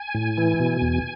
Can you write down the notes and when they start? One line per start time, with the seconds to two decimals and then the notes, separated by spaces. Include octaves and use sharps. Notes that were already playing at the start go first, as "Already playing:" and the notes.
Already playing: G#5
0.15 A2
0.38 E3
0.60 B2
0.82 E2